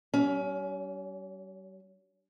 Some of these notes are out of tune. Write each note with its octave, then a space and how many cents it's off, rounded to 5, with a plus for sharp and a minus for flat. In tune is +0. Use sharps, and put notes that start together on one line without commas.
G3 -40 C#4 +25